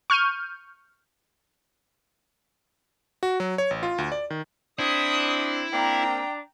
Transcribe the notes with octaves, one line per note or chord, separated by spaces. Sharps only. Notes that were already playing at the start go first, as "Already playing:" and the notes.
C#6 F6 G6 D#7
F#4
F#3
C#5
A1
F4
D2
D5
D#3
C4 D4 E4 D#6
A#3 C4 D4 G5 A#5